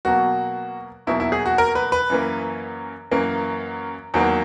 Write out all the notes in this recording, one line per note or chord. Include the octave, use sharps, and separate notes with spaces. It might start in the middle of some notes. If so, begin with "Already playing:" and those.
B2 F#3 A#3 F#4
E2 B2 F#3 A#3 E4
E4
G#4
F#4
A#4
B4
B4
F#2 E3 A#3
F#2 E3 A#3
E2 D#3 F#3 A#3